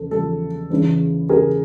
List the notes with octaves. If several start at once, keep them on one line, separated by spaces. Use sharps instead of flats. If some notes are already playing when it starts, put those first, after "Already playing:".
Already playing: E2 C#3 F3 A4
E2 C#3 F3 A4
E2 C#3 E3
E2 C#3 E3 G#4 A#4